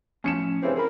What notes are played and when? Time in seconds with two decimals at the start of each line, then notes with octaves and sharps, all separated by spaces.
0.24 A2 F3 C#4 C#7 E7
0.63 G2 C#3 E3 C4 C5
0.76 G#4 A#4 B5